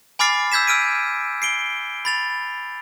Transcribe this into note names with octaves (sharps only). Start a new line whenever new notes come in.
G#5 B5 D6 F6 A6 C7
E6 G6 G#6 B6 E7
E6 F6 D7 D#7
C7 D7 G7
B5 A6 F7